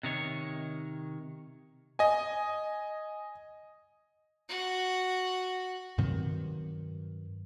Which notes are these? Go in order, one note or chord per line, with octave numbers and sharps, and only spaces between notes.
C3 D#3 C#5
D#5 G#5
F#4
G2 C3 D#3 F#3